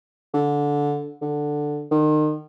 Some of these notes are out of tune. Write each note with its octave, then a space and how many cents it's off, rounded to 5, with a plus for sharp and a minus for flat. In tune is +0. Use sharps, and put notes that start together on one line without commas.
D3 -15
D3 +5
D#3 -35